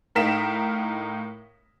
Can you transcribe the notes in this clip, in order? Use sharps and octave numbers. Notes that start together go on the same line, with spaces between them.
A2 D#4 A#4 F5 B6 E7